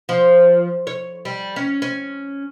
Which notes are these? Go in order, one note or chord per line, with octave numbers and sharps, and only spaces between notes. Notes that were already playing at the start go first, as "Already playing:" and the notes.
F3
C#5
G3
C#4
C#4